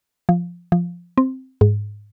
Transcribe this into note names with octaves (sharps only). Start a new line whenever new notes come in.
F3
F3
C4
G#2